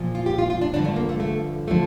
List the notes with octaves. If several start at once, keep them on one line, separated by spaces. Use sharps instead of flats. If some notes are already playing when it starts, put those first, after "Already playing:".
Already playing: A#2 F3
F4
G4
F4
F4
D4
G2 D3 F3 D4
A3
A#3
A3
A3
D3 F3 A3